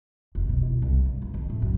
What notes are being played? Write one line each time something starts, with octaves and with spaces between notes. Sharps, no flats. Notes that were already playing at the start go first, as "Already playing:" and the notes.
F1
B2
E4
C2
G2
C#2
F2
A2
F#2